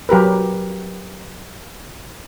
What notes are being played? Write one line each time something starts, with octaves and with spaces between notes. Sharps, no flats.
F#3 G4 A#4 B4